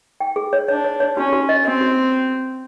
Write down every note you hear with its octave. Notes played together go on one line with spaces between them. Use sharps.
G5
G#4
C#5
D4 C#5
C#5
C#5
C#4 F#4
F#4
D#5
C4 D#5
F#4